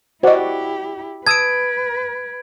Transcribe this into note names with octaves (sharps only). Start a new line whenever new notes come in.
E4 F#4 G4 C5 D5 D#5 F#5
B4 A5 D#6 E6 G#6 D7